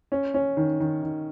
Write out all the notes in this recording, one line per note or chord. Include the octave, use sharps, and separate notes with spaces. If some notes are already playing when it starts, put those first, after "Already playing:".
C#4
C#4
D#3
D#3
D#3